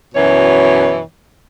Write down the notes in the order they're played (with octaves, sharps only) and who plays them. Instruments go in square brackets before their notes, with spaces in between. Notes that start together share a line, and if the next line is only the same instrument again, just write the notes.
[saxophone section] F#2 B2 E3 C#5